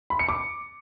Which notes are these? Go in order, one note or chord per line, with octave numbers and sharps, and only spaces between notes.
B5
C#7
D6